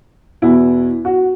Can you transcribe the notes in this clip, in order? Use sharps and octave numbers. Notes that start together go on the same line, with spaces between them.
E2 B2 E4
F#4